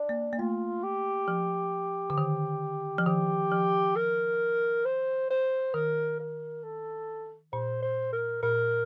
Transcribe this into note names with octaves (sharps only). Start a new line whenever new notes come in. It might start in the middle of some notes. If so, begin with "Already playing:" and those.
Already playing: D4
A#3
A#3
A3 F4
G4
F3
D3
D#3
F3
D#3 G4
F3
A#4
C5
C5
D#3 A#4
A#4
A4
A#2 C5
C5
A#4
A#2 A#4